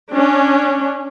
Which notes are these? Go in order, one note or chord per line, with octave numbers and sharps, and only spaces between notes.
C#4 D4